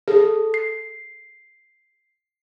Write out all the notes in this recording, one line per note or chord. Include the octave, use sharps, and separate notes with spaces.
G#4 A4
C7